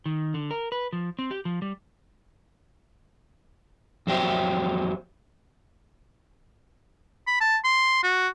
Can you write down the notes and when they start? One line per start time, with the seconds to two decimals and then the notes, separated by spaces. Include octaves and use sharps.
0.06 D#3
0.34 D3
0.51 A#4
0.72 B4
0.93 F3
1.19 C4
1.31 G4
1.45 F3
1.62 G3
4.07 F2 F#3 G4 C5
7.27 B5
7.41 A5
7.64 C6
8.03 F#4